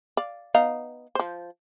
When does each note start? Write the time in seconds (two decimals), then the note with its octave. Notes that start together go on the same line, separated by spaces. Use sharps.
0.17 D5 F5
0.54 B3 D#4 F5
1.15 F3 C5